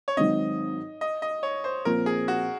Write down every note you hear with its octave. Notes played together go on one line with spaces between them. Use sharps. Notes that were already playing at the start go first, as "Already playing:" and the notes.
C#5
G#1 G#2 F#3 C4 D#5
D#5
D#5
C#5
C5
A#2 F3 C4 A#4
G#4
F#4